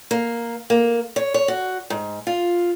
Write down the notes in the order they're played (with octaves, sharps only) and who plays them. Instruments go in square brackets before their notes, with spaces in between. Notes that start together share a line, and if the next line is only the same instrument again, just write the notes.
[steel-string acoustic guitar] A#3
A#3
C#5
C#5
F#4
G#2
F4